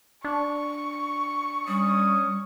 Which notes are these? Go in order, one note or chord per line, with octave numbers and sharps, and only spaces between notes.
D4 C#6
G3 C#4 D#6